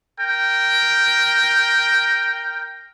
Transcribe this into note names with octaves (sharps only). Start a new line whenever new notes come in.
A#4 G5